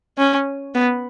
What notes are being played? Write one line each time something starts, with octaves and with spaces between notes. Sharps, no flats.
C#4
B3